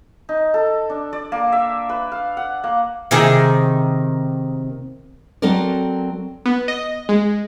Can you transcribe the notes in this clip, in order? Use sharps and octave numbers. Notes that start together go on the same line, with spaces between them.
D#4
A4
D4
D5
A#3
E5
B4
F5
F#5
A#3
C3 D#3 G#4
F#3 C4 F#4 A4 A#4 D5
B3
D#5
G#3